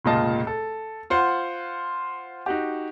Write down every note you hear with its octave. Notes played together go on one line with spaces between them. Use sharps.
F1 C#2 A#2 F4 D#5 A5
A4
F4 C5 F#5
D#4 F#4 G4